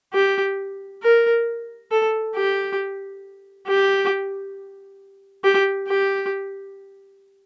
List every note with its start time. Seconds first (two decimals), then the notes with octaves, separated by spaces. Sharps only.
0.14 G4
1.03 A#4
1.91 A4
2.35 G4
3.67 G4
5.44 G4
5.88 G4